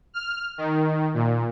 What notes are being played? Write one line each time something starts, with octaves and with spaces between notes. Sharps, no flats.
F6
D#3
A#2